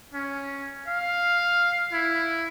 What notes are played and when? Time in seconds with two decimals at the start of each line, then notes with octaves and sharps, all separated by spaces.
0.13 C#4
0.87 F5
1.93 E4